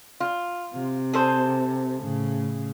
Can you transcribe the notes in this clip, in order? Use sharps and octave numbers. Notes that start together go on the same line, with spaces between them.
F4
C3
G#4 A4 C5
A2 C#3